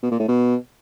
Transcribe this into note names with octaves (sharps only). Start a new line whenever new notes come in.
B2
A#2
A2
B2